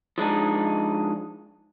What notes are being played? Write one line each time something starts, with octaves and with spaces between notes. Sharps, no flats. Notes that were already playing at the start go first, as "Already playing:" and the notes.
F3 G#3 D4 D#4